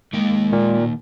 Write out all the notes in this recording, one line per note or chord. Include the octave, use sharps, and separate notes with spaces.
D#3 G#3 A#3 G5
A#2